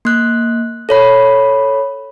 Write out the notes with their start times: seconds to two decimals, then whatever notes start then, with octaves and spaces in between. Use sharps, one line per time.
0.05 A#3 F#6
0.89 A4 C#5 B5